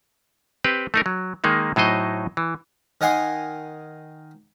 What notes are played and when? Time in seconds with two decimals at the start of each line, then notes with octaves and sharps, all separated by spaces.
0.64 C4 G4 B4
0.94 A3 D#4 A#4
1.06 F#3
1.44 D#3 G#3 A#3 D#4
1.76 A2 F#3 D#4 C5 D#5
2.37 E3
3.01 D#3 D#5 F#5 G#5 C6 D#6